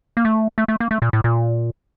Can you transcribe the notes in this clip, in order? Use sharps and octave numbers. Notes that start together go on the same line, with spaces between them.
A#3
A3
A3
A3
A#3
A3
A#2
A2
A#2